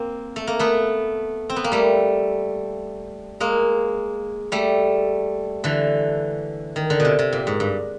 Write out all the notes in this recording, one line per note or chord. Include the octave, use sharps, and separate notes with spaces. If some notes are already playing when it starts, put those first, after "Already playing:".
Already playing: A#3 C4
A3
A#3
A3 B3
C4
B3
A#3
G3 A3
G#3 A#3
G3 A3
D3 E3
D#3
D3
B2
C3
C3
A#2
G#2
G2